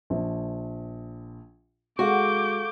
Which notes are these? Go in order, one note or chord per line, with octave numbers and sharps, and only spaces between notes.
A#1
G#3 F#4 A4 F5 C#6 D6 G6